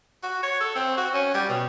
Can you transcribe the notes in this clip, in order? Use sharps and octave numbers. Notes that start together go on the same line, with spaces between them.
F#4
C#5
A4
C4
F#4
C#4
G3
B2